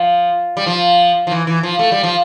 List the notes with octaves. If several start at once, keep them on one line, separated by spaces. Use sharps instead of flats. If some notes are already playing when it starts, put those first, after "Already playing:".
Already playing: F3
G3
F3
F3
E3
E3
F3
A3
G3
F3